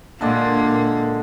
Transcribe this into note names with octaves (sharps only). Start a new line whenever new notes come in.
A#2 D3 G#3 A#3 D5